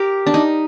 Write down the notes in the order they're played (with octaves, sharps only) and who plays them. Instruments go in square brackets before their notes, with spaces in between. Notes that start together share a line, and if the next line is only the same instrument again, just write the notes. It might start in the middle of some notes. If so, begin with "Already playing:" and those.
Already playing: [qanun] G4 A#4
D4
D#4